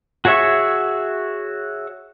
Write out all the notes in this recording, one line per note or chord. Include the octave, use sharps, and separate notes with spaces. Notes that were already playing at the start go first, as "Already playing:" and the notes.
F#4 G#4 C#5 E5 C#6